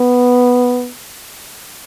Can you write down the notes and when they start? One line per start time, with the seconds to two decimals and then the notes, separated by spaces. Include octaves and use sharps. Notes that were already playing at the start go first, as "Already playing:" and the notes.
Already playing: B3